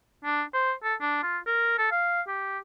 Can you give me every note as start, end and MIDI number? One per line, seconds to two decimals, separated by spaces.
0.25 0.43 62
0.54 0.73 72
0.84 0.95 69
1.01 1.19 62
1.23 1.38 65
1.47 1.76 70
1.78 1.87 69
1.92 2.22 77
2.28 2.59 67